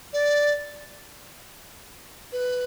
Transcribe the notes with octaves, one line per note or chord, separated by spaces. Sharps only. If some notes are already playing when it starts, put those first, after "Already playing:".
D5
B4